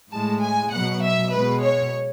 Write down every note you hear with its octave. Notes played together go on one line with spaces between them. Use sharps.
A2 G#3 A5
G#5
B2 F#3 F#5
E5
B2 G#3 B4
C#5